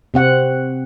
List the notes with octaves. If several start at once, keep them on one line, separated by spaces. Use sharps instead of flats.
C3 C4 F#5